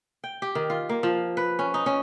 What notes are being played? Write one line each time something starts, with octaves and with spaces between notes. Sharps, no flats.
G5
G4
D#3
F4
A#3
F3
B4
C#4
D#4
C#4